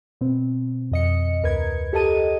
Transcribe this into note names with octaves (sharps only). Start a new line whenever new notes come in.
B2 C4
F2 D#5 C#7
D2 A#4 B4 G#6
G4 A4 A#4 D#5 A5 D#7